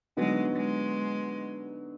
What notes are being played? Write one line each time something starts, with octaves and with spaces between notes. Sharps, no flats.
D3 F#3 G#3 B3 D#4 F#4
G#3